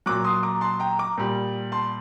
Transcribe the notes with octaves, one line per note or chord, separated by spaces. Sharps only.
A#2 F#3 D6 F#6
C6 D#6
A#5 D6
A5 C6
G5 A#5
A#5 D6
A#2 G3
A5 C6